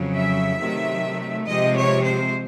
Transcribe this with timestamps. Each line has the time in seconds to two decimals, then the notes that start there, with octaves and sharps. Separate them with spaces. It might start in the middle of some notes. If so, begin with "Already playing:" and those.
Already playing: F2 C#3 F#3
0.17 E5
0.59 C3 D#3 F#3 A3
1.46 C3 F3 G#3 D#5
1.75 C#5
2.03 C5